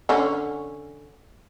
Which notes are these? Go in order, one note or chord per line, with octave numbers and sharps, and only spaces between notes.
D3 C#4